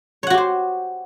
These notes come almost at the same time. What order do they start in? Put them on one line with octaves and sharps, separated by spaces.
C#5 F#5 F#4 G4 C5